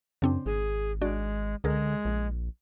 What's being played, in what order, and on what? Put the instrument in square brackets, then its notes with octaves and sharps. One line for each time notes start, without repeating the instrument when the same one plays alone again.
[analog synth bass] F#2 [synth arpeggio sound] C#3 C4 D4
[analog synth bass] G#1 [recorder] G#4
[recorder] G#3 [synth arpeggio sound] D4 F#4 D5
[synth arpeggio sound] C#2 G#4 A#4 [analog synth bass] D3 [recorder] G#3
[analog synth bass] A#1